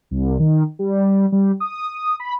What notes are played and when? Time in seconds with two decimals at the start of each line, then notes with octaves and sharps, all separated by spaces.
0.11 C2
0.39 D#3
0.79 G3
1.32 G3
1.60 D#6
2.20 B5